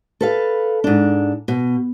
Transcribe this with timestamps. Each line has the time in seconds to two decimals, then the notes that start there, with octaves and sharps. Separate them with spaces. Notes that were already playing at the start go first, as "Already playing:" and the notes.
0.21 A4 B4 F5
0.84 G#2 D4
1.48 B2